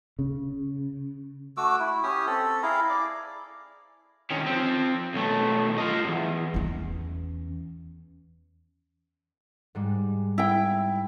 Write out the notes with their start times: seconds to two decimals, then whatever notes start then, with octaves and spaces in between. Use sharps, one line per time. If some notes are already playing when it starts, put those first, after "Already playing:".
0.19 C#3
1.57 A3 F#4 D6 E6
1.80 E4
2.03 C#4 G4 G#5 D#6
2.27 C4 A4
2.63 E4 G#4 F5 A#5
2.90 D5 D6
4.30 D#3 C#4
4.46 F3 C4
5.14 B1 A3
5.78 F4 D#5
6.04 E2 G2
6.54 E2 C#4
9.75 G#2 G3 G#3
10.38 E4 G5